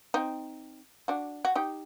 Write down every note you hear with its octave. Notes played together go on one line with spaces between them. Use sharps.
C4 D#4
D4 F#4
F#4
D#4 G4